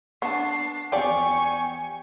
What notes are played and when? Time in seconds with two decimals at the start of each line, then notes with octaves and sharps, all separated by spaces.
0.22 B3 D4 A5 C#6 C7
0.92 E2 F3 G4 D5 G5 G#5 C#6